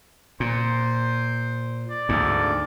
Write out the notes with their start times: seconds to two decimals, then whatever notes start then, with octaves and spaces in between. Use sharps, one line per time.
0.40 A#2 C5
1.91 D5
2.09 D2 G#2